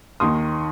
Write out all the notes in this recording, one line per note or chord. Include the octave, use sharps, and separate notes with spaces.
D#2 D#3 C6 D#6